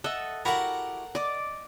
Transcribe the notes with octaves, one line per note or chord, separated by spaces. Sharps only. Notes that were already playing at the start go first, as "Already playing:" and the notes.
A4 D#5 E5 F#5
E4 F#4 G4 A#4 F#5
D5 D#5 D6